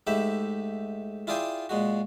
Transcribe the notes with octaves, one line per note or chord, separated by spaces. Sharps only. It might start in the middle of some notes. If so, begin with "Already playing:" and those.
G#2 A3 G4 E5 B5
E4 F4 G#4 D5 G5 G#5
A#2 G#3 F#4